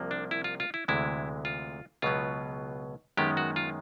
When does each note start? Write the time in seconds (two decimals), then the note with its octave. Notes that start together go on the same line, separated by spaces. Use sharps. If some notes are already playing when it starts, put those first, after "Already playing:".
Already playing: C2 C3 F3 A#3
0.11 D4
0.31 E4
0.44 F4
0.60 F4
0.74 E4
0.88 D2 C3 E3 G#3 E4
1.45 F4
2.02 C#2 B2 F#3 B3 F4
3.17 F#2 D#3 G#3 B3 G4
3.37 F#4
3.56 F4